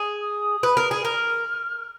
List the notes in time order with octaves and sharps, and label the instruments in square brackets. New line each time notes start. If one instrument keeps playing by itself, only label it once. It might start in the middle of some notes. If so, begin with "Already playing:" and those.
Already playing: [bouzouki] G#4
[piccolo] D#6
[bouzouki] B4
A#4
G#4
[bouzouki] A#4 [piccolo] F6